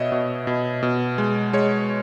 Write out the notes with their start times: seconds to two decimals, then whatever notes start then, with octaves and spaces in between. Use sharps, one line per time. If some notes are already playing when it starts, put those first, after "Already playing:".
Already playing: B2 B3 C#5 D#5 E5
0.12 B2
0.47 B2
0.83 B2
1.18 G#3
1.53 G#3 C#5